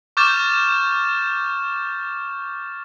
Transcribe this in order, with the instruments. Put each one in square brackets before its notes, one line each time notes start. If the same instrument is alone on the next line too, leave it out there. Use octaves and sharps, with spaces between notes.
[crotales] C#6 D6 F6 G6 A6 E7